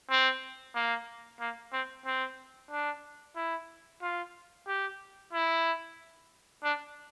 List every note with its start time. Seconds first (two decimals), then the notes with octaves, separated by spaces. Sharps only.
0.10 C4
0.75 A#3
1.40 A#3
1.73 C4
2.06 C4
2.71 D4
3.36 E4
4.02 F4
4.67 G4
5.33 E4
6.64 D4